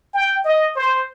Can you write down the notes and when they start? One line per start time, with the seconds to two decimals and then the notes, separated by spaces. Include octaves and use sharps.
0.14 G5
0.45 D#5
0.76 C5